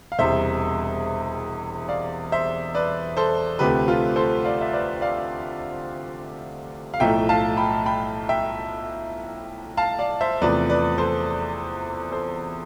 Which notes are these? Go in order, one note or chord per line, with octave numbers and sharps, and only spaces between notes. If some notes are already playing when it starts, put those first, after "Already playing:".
F5
E1 E2 C3 G3 C5 E5
D5 F5
C5 E5
B4 D5
A4 C5
D2 C3 F3 A3 G4 B4
F4 A4
A4 C5
D5 F5
E5
B4 D5
D5 F5
F5
B1 A2 F3 A3 E5 G5
F5 A5
G5 B5
G5 B5
E5 G5
F5 A5
D5 F5
C5 E5
E2 C3 F3 A3 B4 D5
B4 D5
A4 C5
A4 C5